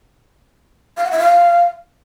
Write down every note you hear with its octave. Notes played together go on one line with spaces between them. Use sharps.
F5
F#5
E5
F5